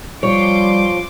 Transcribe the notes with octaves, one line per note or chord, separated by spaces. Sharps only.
F3 G3 C#5 C6 D6